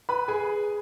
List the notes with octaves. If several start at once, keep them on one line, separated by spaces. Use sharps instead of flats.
B4 B5
G#4 G#5